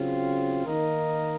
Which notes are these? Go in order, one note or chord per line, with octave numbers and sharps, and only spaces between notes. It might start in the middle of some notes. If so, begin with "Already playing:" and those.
Already playing: C#3 F#3 C4 F4
D#3 A#3 D#4 A#4 D#5